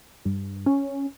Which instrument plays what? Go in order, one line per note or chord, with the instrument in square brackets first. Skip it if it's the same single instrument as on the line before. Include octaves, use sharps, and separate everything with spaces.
[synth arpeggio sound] G2
C#4